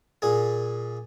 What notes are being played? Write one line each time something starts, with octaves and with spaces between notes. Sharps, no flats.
A#2 G#4